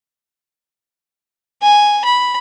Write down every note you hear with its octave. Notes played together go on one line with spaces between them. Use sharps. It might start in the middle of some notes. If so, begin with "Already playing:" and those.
G#5
B5